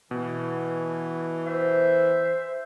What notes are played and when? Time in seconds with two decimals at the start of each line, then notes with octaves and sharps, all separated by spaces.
0.11 B2 E3
1.47 C5 E5